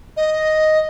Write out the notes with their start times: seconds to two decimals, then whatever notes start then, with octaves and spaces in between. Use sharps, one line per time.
0.17 D#5